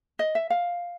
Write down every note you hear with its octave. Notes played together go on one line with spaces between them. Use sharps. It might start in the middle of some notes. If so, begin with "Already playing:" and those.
D#5
E5
F5